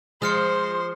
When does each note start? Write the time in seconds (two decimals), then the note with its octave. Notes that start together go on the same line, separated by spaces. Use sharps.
0.22 F3 G#3 C5 D#6 F6 C#7